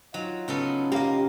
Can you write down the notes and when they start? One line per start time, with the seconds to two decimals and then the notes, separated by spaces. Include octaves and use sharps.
0.14 F#3 D#4 F4
0.48 C#3 B3 A4
0.92 A#3 G4 D#5 F5